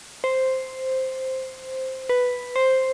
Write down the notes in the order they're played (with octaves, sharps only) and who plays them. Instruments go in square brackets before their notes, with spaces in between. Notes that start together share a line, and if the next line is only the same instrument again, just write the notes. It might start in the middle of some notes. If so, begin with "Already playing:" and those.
[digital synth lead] C5
B4
C5